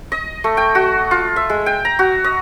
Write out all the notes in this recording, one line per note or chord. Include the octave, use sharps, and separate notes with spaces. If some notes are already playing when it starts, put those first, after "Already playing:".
D#5
A3
G5
F#4
F4
E5
G#3
G5
A#5
F#4
D#5